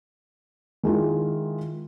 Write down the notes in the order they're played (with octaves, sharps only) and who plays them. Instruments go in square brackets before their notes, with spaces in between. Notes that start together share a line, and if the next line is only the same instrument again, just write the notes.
[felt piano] D#3 G#3 E4 F4